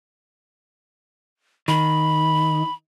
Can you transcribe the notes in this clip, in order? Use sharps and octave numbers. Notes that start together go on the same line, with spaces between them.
D#3 B5